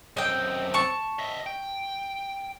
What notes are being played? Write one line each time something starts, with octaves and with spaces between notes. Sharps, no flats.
F#2 C4 D#5 G5
A5 C#6
D#5 E5
G5